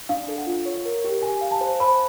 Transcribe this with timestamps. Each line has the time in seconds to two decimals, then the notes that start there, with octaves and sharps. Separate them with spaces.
0.09 D4 F5
0.28 A4
0.38 F#5
0.47 F4
0.65 C#5
0.85 A#4
1.05 G4
1.22 G4 G#5
1.41 F5
1.51 A5
1.61 C5
1.80 C5 B5